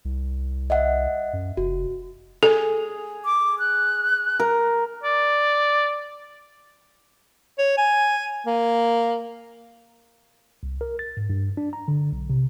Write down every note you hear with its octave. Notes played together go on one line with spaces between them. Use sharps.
C2
D#5 E5 F#5
F#2
F1 F#4
G#4 A4
D6
F#6
A#4
D5
C#5
G#5
A#3
C2
A#4
A6
G#2
G2
D4
A#5
D3
B1
C3